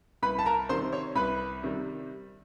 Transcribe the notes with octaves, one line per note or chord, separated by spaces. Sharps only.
C2 B4 B5
A5
A#4 A#5
C3 D#3 G3 C5 C6
C#5 C#6
C2 B4 B5
C3 D#3 G3